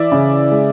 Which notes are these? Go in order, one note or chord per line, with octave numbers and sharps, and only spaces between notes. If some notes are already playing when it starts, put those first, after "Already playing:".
Already playing: E3 D5 E5
C#3
G#3